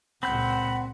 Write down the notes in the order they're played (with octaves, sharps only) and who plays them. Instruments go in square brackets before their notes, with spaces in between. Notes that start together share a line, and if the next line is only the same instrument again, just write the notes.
[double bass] C#2 A#2 [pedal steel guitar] C4 G6 [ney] F#5 [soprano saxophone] B5